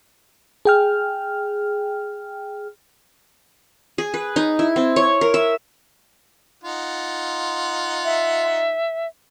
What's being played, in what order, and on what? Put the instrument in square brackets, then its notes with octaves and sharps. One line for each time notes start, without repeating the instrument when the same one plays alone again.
[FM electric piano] G#4 G5 F6
[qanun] G#4
B4
D#4
E4
C4
C#5
A#4
E5
[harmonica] D#4 F4 F#5
[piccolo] E5